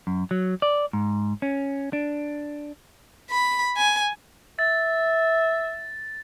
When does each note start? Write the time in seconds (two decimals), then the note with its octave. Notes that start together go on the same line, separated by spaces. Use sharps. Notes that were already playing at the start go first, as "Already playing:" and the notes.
0.07 F#2
0.31 F#3
0.62 D5
0.93 G#2
1.42 C#4
1.93 D4
3.30 B5
3.77 G#5
4.59 E5 A6